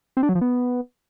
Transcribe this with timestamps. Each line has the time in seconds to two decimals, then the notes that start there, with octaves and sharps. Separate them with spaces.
0.17 C4
0.23 D4
0.29 F#3
0.35 F3
0.41 B3